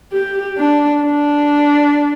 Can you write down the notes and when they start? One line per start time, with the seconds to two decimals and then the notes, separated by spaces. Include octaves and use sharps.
0.13 G4
0.58 D4
1.04 D4